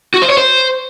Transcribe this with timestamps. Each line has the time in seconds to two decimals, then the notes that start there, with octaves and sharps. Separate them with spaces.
0.14 F#4
0.22 C5
0.30 C#5
0.38 C5